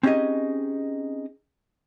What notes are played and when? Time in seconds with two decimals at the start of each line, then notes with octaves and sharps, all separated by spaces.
0.03 C4 C#4 D#4 G4 G#4 D#5